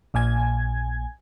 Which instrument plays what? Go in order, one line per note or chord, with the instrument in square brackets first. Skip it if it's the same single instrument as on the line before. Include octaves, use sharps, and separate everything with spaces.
[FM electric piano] A#1 A#2 G#5 G#6